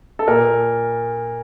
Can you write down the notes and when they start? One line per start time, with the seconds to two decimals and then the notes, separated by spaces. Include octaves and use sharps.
0.19 A4
0.28 A#2 A#4